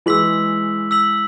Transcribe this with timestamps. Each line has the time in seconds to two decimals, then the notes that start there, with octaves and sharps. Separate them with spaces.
0.06 E3 G#3 E6 B6 F#7
0.91 E6 B6 F#7